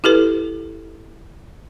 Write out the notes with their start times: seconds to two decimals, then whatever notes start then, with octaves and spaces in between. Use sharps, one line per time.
0.04 E4 G4 A4 B4